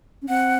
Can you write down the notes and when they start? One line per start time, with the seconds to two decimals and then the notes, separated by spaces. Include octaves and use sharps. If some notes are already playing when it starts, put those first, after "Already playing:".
0.22 C#4
0.29 C4 F#5